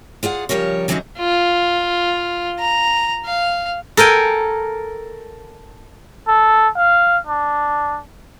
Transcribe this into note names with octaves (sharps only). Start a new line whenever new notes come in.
F4 G#4 D5 F#5
C#3 F3 G3 A#4 C#5
D3 E3 F#3 C4 C#4 D#4
F4
A#5
F5
A4 A#4 G5 G#5
A4
F5
D4